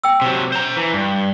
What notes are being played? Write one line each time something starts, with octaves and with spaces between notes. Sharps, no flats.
G5 E6
C3 F#3
C5 A#5
E3
G2